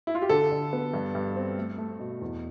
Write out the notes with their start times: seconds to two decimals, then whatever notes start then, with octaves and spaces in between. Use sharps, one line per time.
0.07 E4
0.15 F4
0.22 G4
0.29 D3 A4
0.52 D3
0.73 B3
0.94 G2
1.15 G2
1.36 C4
1.58 A3
1.78 A3
1.99 B2
2.21 E2